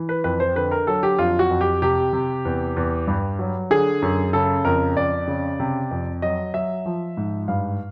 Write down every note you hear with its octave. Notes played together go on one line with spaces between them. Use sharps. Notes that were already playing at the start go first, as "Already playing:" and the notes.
Already playing: E3
B4
F2 B4
C5
D3 B4
A#4
F#3 A4
G4
F2 F4
F#4
F2
G4
C3 G4
C3
E2
E2
G2
F#3
D3 G#4
F#2
C#3 A4
F2 A#4
F2 D5
C#3
C3
F2
F#3 D#5
F#3 E5
F3
G#2
G2 F5